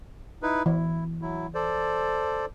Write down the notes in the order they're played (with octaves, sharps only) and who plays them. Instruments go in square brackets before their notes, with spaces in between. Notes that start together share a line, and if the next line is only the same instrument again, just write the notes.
[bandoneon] D#4 E4 B4
[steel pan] E3 [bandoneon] E4
[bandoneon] F#3 E4
A4 C5 D5